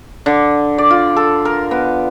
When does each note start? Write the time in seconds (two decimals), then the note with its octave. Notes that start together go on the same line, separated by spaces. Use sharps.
0.26 D3
0.78 D5
0.90 F4
1.16 A4
1.45 A#4
1.71 B3